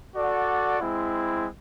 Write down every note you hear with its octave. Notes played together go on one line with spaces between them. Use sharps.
F#4 A4 D5 F#5
G#3 C4 E4